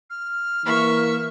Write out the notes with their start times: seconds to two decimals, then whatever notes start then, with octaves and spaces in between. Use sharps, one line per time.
0.10 F6
0.65 E3 A#3 E5 C#6